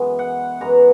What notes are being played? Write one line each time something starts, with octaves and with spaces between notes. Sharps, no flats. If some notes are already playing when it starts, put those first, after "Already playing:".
Already playing: F#2 E3 G#3 B3
F#5
F#2 E3 G#3 B3 A#5